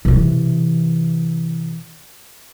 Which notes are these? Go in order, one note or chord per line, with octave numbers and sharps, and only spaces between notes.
C3 E3